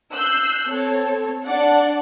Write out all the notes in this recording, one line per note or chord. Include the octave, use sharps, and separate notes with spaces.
E6 F#6 G6 C7
C4 A4 C#5
D4 D5 F#5